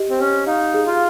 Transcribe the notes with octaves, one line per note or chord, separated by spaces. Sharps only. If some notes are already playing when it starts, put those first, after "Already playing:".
Already playing: G4 D#5
C4
C#4 G4
D#4 F5
G#4
F4